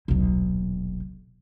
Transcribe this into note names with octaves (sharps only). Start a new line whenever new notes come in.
D#1 B1